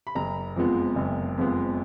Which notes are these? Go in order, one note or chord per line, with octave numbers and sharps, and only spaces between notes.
B5
F#1 A#5
F2 F3 G#3 B3
F#1
F2 F3 G#3 B3